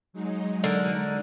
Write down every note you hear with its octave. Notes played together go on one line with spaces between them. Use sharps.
F#3 G#3 D#4
D3 A#4